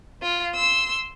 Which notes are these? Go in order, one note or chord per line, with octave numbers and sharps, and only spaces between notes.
F4
C6 E6